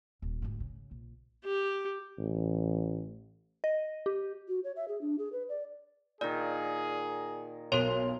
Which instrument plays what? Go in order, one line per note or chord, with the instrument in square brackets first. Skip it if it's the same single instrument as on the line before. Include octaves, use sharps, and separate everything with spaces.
[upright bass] D#1
D2 G#2
C#3
A#1
[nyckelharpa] G4
[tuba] A1
[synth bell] D#5
G4
[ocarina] F#4
C#5
E5
G#4
D4
G#4
B4
D5
[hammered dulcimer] A#2 D#3 [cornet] G#4 [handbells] D5
[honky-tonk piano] B1 C6 F7 [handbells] A#4 C#5